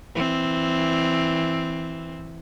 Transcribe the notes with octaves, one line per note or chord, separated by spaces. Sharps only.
E3 C4